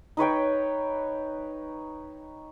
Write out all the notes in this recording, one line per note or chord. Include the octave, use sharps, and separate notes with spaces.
D#4 B4 C#5 G5